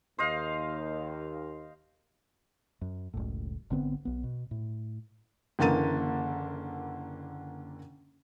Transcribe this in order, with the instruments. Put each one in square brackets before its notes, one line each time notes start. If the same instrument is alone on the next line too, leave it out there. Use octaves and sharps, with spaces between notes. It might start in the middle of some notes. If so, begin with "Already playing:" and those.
[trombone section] D#2 [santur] C5 D#5 F5
[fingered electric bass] F#2
F#1 C#2 A2
G#1 D3 B3 C4
B1 B3
B2
A2
[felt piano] F#1 D3 E3 A#3 A6 D#7